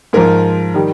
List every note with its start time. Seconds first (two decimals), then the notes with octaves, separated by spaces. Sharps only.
0.13 G#2 F3 A#4
0.74 D#3 G3